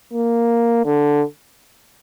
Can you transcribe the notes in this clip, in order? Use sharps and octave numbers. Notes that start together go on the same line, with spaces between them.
A#3
D3